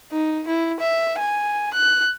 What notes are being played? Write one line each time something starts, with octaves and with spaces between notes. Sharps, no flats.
D#4
E4
E5
G#5
F#6